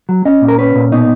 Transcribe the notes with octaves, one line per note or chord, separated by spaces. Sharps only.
F#3
C#4 D#5
A#2
A#4
C#4 B4
A#2
B2 D#4